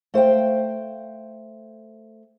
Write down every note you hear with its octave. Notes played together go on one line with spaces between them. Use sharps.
A3 C5 F5 G5